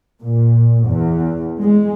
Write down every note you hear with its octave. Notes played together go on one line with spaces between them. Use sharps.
A#2
E2
G#3